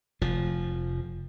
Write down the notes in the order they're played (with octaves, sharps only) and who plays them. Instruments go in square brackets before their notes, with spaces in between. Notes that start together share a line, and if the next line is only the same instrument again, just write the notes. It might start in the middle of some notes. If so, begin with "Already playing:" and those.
[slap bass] F1 F3